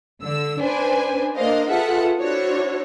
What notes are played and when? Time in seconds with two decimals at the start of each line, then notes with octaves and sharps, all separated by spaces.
0.22 D3 E6
0.60 D4 B4 C5 G#5
1.37 A#3 D4 A#4 C5 D#5 F5
1.70 F4 G#4 A4 B4 E5 F#5
2.20 D4 E4 F#4 C5 C#5